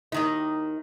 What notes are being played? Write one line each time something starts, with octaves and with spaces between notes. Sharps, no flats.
D#2 D#3 D#4